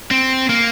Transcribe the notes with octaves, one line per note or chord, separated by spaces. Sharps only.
C4
A#3